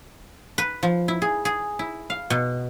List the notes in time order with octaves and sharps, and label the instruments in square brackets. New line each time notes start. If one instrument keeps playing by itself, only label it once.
[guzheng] B4
F3
E4
G#4
G#4
E4
F5
B2